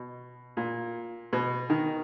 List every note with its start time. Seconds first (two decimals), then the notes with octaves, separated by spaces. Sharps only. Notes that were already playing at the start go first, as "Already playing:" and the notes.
Already playing: B2
0.57 A#2
1.33 B2
1.70 D#3